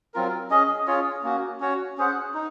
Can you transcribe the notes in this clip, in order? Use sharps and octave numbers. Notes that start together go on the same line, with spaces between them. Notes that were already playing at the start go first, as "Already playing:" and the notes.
F#3 C4 F4 A#4
C#4 G#4 D#5
C#4 F4 G#4 C#5
A#3 C#4 F#4
C#4 F#4 C#5
C#4 G#4 C5 F#5
D#4